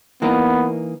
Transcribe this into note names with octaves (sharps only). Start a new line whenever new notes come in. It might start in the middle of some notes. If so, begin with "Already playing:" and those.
E3 A#3 B3 D#4 A#4